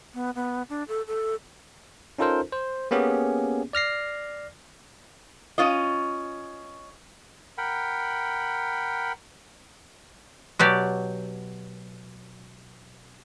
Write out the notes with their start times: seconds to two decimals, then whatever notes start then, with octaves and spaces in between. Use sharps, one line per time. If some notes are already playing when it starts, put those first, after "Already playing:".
0.14 B3
0.35 B3
0.69 D4
0.88 A4
1.08 A4
2.19 C#4 D#4 F4 A4 A#4 C5
2.52 C5
2.91 A#3 B3 C#4 G4 G#4
3.73 D5 F6 A#6 C7
5.58 C#4 F4 D#5
7.58 A#4 F#5 G5 B5
10.59 B2 F#3 G4 D5